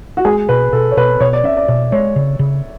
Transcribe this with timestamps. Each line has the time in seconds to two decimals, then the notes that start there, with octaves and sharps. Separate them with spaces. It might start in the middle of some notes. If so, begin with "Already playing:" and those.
0.17 F#4
0.25 G#3 G#4
0.49 B2 B4
0.73 B2 A4
0.91 C#5
0.97 B2 B4
1.20 B2 C#5
1.33 D5
1.44 C#4 E5
1.57 D5
1.68 B2 D5
1.92 G#3 C#5
2.16 C#3
2.39 C#3